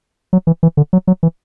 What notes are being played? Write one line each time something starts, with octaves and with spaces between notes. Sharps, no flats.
F#3
E3
E3
D3
F#3
F#3
E3